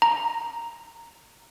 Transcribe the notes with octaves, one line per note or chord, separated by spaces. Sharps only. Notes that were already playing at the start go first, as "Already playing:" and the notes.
A#5